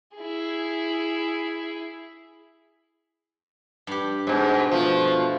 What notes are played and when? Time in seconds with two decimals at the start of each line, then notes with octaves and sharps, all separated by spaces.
0.16 E4 G#4
3.87 G2 G4
4.27 G#2 B2
4.71 B2 F3 A3 F4